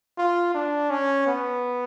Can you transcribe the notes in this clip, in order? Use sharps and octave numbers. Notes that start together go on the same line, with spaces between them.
F4
D4
C#4
B3